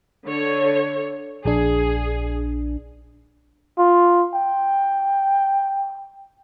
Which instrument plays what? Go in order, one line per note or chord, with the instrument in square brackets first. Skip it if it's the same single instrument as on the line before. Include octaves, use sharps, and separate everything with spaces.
[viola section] D3 C#5
[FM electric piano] A#1 D4 [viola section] G#4
[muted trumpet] F4
G5